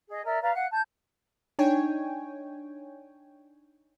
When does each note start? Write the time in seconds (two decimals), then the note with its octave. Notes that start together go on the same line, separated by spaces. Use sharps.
0.09 G#4 D#5
0.25 A#4 D5 E5
0.41 B4 D5 F5 A#5
0.53 F5 F#5 F#6
0.70 A5 G6
1.59 D4 D#4 C#5 G5 G#5